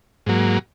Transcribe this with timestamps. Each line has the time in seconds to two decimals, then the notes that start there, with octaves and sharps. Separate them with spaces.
0.26 G#2 F#3 A#3